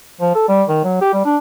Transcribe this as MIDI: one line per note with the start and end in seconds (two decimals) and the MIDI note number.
0.21 0.31 53
0.35 0.46 69
0.48 0.63 55
0.68 0.80 51
0.84 1.01 54
1.01 1.11 67
1.13 1.22 55
1.25 1.37 62